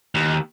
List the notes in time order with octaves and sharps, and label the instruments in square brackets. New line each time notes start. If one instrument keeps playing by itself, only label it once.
[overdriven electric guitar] D#2